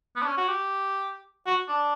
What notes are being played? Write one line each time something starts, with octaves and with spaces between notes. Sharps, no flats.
B3
D4
C#4
F#4
G4
F#4
D4